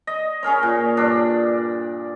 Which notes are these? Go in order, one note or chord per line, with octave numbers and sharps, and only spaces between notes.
D#5
C#4 G#4 A#4 C#5
A#2
G2 D4